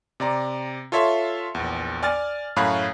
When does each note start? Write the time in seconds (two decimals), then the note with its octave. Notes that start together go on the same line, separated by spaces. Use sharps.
0.20 C3 D5 A#5
0.92 F4 A4 C#5 E5 C6
1.55 A#1 E2
2.03 D5 G#5 F6 A6
2.56 F#2 A2 C#5 F5 B5 F#6